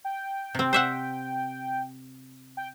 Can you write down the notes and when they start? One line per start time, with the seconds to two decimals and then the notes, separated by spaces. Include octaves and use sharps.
0.05 G5
0.55 C3 C4
0.73 C5 E5 F#5
2.57 G5